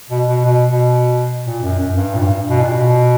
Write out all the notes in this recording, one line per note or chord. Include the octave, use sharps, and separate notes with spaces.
B2
B2
B2
B2
A#2
F#2
F#2
G2
A#2
G2
B2
A#2
B2